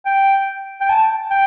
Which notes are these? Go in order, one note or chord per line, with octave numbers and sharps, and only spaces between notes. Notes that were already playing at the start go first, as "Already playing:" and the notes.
G5
G5
A5
G5